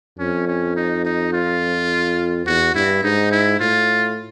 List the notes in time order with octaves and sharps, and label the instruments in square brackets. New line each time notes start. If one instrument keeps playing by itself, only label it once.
[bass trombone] F2 [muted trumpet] C#4
[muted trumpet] C#4
D#4
D#4
F4
[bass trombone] E2 [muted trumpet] F#4
[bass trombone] G2 [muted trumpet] E4
[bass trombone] G#2 [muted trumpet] D#4
[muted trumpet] E4
[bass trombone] A2 [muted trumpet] F4